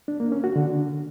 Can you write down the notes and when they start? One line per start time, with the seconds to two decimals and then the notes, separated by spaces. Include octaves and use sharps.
0.08 D4
0.20 A#3
0.32 C#4
0.44 F#4
0.56 D3